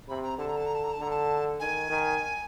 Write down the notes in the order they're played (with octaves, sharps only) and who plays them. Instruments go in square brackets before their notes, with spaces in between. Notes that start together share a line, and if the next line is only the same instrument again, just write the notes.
[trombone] C3 [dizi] B5
[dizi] A#5
[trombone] D3 [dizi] A5
[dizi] A#5
A5
A#5
A5
A#5
A5
[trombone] D3 [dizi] A#5
[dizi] A5
[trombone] D#3 [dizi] G#5
[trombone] D#3